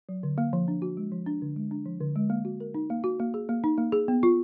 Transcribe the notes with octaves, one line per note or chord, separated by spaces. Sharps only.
F#3
D3
A#3
F3
D4
F#4
G#3
F3
D4
D3
G#3
D4
F3
D3
G#3
A#3
F#4
A#4
D#4
A#3
F#4
A#3
G#4
A#3
D#4
A#3
G#4
B3
F4